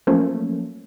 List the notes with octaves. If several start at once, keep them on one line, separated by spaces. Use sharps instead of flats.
F3 F#3 A3 A#3 C#4